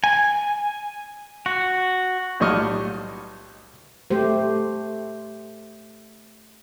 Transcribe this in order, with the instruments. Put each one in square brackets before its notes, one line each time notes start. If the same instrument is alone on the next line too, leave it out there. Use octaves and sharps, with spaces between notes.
[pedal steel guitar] G#5
F#4
[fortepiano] B1 A2 G3 D#5 C#6 F6
[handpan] A3 G4 C5